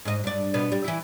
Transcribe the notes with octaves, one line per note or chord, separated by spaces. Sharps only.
G#2 D#5
G2 D5
B2 B3
G3
E3 E4